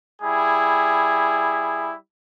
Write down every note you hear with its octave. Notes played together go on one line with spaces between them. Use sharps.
G3 E4 G#4